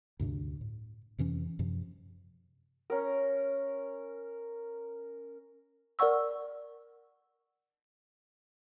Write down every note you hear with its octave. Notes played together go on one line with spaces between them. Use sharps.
D2 G2 C3 D4
A2
F2 C3 E3 C#4
F#2 C3 F3
C#4 A#4
A#4 D5 F#5 C#6 E6